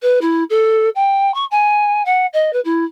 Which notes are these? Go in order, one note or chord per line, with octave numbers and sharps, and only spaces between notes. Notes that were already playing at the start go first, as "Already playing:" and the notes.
B4
E4
A4
G5
C#6
G#5
F#5
D#5
B4
E4